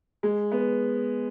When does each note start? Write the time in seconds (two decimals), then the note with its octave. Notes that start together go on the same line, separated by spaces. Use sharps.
0.23 G#3
0.52 B3